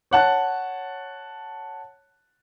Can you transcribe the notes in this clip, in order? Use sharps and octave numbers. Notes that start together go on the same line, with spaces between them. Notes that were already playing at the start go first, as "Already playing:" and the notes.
C#5 F#5 A5 F#6